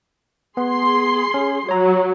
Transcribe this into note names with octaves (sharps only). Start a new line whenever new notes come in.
B3 G#4 C6
C#4
F#3 C#5 A#5